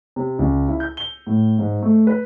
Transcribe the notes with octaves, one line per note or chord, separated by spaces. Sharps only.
C3
C#2
E4
G6
G7
A2
G#2
A3
B4